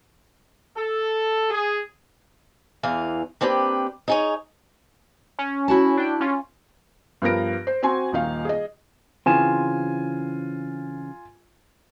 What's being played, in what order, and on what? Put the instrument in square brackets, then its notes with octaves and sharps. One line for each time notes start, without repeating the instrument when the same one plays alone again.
[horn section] A4
G#4
[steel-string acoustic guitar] E2 E3 F5
A#3 C4 D4 G4 B4
D#4 G#4 C#5
[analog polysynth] C#4
[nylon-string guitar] E4 F#4 A5
[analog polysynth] D4 G5
C#4 F4
[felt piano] G2 F3 B3 A#4 A#6 D7
C5
C4 F#4 G#5 C6
D#1 A#1 D#3 D#4 F5
G#4 D#5
[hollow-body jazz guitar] C#3 E3 C4 [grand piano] F4 G#5 E7